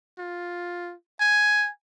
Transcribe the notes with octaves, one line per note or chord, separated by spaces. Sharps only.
F4
G#5